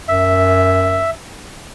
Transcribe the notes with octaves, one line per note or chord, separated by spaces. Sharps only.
F#2 E5